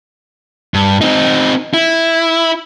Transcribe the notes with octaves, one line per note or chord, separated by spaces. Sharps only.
G2
C4 D#4
E4